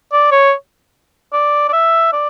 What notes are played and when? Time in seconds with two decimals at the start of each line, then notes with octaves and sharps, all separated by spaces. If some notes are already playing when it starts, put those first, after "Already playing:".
0.12 D5
0.31 C#5
1.33 D5
1.68 D5
1.73 E5
2.13 D5